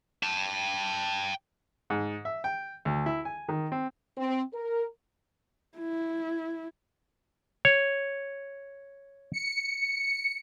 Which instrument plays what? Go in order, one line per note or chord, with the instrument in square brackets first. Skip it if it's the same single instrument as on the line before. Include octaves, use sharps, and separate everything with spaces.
[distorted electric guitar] G5 A5
[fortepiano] G#2
E5
G5
D2
E4
G#5
D#3
C4
[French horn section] C4
A#4
[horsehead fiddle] E4
[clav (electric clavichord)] C#5
[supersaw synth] C#7